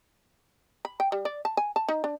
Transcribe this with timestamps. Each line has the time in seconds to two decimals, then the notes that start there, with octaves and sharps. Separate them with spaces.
0.85 B5
1.00 G5
1.12 G3
1.25 D5
1.45 A5
1.57 G#5
1.76 A5
1.88 D#4
2.04 D4